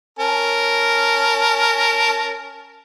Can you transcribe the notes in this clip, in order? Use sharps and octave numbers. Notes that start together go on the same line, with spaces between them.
C#4 A#4 A5